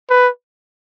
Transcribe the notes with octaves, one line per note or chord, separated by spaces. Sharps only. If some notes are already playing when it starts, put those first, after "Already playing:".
B4